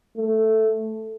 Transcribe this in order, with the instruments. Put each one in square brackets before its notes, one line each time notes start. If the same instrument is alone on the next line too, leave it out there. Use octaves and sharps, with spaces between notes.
[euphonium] A3